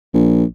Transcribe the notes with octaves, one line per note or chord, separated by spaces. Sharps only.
A#1